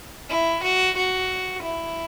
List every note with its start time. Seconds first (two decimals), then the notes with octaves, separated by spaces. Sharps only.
0.30 E4
0.63 F#4
0.97 F#4
1.63 E4